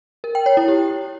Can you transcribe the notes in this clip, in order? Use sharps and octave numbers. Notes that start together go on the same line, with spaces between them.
A#4
G5
C#5
E4
G4